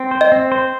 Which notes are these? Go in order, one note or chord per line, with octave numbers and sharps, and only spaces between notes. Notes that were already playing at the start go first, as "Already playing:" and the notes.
Already playing: C4
C5
D#5
C4
C5